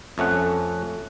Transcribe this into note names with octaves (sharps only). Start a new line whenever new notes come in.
F2 A3 C#4 F#5